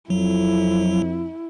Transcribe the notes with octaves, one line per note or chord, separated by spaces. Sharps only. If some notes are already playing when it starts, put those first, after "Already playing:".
F2 F#3 E4